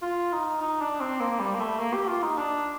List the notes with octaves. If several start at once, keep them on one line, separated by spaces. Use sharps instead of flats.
F4
D#4
D#4
D4
C4
A#3
G3
A#3
A3
A#3
G4
F4
D#4
D4